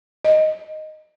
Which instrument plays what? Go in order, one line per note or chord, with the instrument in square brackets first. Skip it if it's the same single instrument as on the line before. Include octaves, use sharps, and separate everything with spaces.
[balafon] D#5